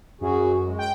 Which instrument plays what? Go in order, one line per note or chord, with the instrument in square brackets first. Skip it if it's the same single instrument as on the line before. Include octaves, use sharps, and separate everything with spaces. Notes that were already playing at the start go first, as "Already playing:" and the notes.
[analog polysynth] F#2 [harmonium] F#4 G#4
[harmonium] G#3
[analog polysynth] G5